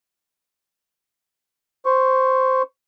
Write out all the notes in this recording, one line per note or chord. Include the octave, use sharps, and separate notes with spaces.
C5 C#6